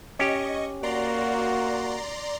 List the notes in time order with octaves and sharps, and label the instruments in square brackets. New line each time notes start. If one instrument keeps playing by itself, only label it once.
[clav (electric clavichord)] C#4 G4 [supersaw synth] D#5 C#6
[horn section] A#3 F#4 [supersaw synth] D5 A#5 C6